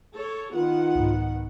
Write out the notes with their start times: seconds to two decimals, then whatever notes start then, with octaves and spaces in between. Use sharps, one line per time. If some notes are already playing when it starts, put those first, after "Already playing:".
0.15 A4 C#5
0.53 D#3 B3 F4 F#5
0.95 C2 G#2